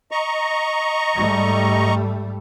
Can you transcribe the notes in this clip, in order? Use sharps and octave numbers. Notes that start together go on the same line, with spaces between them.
D#5 A#5 C#6
G#2 G3 A3